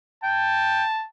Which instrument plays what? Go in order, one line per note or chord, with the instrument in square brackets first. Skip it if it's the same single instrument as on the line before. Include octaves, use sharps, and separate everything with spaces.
[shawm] G5 [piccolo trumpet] A5